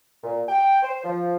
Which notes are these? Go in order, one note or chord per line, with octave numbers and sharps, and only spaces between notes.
A#2
G5
C5
F3